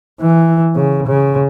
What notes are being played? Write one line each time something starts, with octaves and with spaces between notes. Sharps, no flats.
E3
C#3
C#3